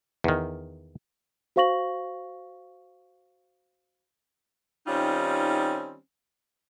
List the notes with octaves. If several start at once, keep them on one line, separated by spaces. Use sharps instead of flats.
E2 D#3
F#4 C5 F5 C#6 A#6 F#7
D#3 G3 C4 C#4 D#4 F4